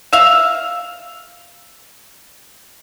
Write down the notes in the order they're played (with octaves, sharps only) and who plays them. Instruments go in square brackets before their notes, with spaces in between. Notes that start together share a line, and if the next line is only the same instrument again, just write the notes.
[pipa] E5 F5